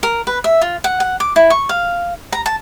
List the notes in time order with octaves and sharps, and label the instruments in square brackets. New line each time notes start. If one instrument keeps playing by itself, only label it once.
[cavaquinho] A#4
B4
E5
F4
F#5
F#5
D6
E4
C#6
F5
A#5
A5